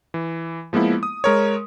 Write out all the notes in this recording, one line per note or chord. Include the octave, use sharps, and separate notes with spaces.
E3
F3 G#3 A#3 B3 E4
D#6
G#3 A#4 C#5